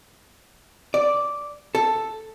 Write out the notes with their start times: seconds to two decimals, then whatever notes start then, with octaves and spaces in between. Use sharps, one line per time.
0.94 D5
1.75 A4